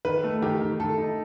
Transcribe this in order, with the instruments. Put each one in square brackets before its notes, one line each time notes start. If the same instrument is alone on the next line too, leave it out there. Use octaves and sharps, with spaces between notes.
[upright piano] D#3 [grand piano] B4
[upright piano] A3
[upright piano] D#3 [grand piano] G4
[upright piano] D#3
[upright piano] D#3 [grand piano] A4
[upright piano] D#4